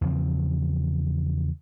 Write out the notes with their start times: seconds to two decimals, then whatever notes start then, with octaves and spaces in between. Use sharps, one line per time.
0.01 E2 C#3 F3 C4